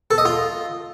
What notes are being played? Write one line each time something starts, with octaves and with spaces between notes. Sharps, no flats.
A4
D#5
F4